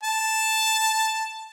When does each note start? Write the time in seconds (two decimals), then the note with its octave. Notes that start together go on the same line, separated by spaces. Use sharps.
0.03 A5